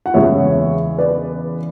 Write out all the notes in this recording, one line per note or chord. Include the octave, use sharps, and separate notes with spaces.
F#5
E2 C#3 G#3 C#5 E5
B4 D5